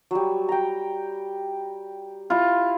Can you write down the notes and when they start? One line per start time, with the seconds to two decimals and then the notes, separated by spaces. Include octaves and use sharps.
0.11 F#3 G3
0.49 G5 A#5
2.30 E4 F4